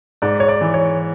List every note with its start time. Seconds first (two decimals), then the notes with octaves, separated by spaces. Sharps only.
0.22 G#2 D5
0.40 C#5
0.48 D5
0.61 E3 G#3
0.74 C#5